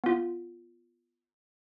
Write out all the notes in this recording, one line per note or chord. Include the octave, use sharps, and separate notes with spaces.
B3 F4